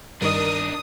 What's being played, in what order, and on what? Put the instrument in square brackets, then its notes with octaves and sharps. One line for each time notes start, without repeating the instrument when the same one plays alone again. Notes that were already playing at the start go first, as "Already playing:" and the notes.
[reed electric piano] G2 D#3 D#5 [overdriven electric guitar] D4 D#4 [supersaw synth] A#4 [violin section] D#6